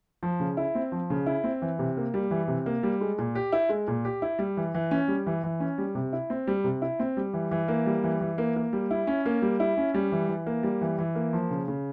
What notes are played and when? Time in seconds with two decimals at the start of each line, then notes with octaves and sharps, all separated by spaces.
0.23 F3
0.40 C#3
0.57 E4
0.75 C4
0.92 F3
1.10 C#3
1.26 E4
1.44 C4
1.62 E3
1.79 C3
1.97 A#3
2.14 G3
2.31 E3
2.48 C3
2.66 A#3
2.83 G3
3.01 G#3
3.18 A#2
3.35 G4
3.53 E4
3.69 G#3
3.88 A#2
4.05 G4
4.22 E4
4.39 G3
4.57 E3
4.75 E3
4.91 C#4
5.08 G3
5.27 E3
5.44 E3
5.60 C#4
5.78 G3
5.95 C3
6.13 E4
6.30 C4
6.47 G3
6.64 C3
6.82 E4
7.00 C4
7.17 G3
7.34 E3
7.51 E3
7.68 A#3
7.86 G3
8.04 E3
8.21 E3
8.38 A#3
8.56 A#3
8.73 G3
8.91 E4
9.07 C#4
9.26 A#3
9.42 G3
9.60 E4
9.77 C#4
9.94 G3
10.12 E3
10.29 E3
10.47 A#3
10.63 G3
10.82 E3
10.99 E3
11.15 A#3
11.33 F3
11.50 C#3
11.68 C#3